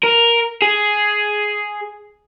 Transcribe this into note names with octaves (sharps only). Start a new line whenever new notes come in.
A#4
G#4